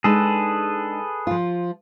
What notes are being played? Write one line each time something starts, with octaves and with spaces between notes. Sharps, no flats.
G#3 D4 D#4 G#4 A4 B4
F3 F4